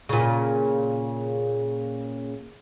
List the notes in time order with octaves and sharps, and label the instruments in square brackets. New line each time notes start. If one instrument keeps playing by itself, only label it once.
[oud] A#2 C#3